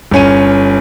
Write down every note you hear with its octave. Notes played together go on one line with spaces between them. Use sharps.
G1 C#4 D#7